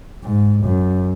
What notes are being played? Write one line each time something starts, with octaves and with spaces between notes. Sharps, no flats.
G#2
F#2